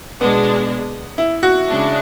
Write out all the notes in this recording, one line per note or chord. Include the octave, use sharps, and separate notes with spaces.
B2 G#3 B3 D4
E4
F#4
C#3 G#3 D4